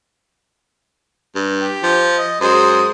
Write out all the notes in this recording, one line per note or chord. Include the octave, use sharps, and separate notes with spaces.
G2
G4
F3
D#5
F#2 G#3 C5 D#6